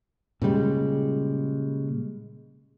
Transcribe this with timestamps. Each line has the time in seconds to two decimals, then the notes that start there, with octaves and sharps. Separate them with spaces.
0.42 A#2 C#3 G3 G#3